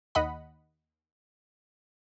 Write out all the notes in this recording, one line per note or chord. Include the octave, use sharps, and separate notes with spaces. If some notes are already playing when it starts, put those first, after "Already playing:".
D#2 D#5 F#5 B5